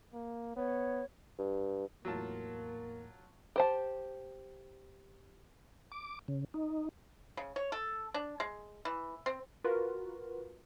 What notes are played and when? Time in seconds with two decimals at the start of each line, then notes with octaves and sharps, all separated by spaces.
0.13 A#3
0.56 B3 C#5
1.39 G2
2.05 E2 A2 F#3 A#3 F4 A5
3.56 G4 C5 A5
5.92 D6
6.28 C#3
6.54 D#4
7.37 C#3
7.56 C#5
7.72 A4
8.14 D4
8.40 G#3
8.85 E3
9.26 C4
9.64 F4 F#4 A#4 B4